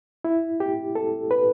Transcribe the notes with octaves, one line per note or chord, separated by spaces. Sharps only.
E4
G4
A4
B4